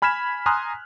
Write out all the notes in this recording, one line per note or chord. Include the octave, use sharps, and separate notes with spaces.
G#5 B5 F6 G#6 B6 E7
G#5 A#5 C6 D#6 F6 F#6